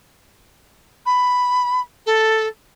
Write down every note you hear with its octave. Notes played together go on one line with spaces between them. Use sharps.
B5
A4